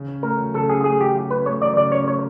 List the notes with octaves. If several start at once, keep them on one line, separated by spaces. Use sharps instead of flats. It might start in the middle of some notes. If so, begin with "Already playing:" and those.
Already playing: C#3
C#4
A3 A#4
F#3
C#3 A4
C#4 G#4
A3 G#4
F#3 G4
C#3
C#4 B4
A3 C#5
F#3 D5
C#3 D5
C#4 C#5
A3 C#5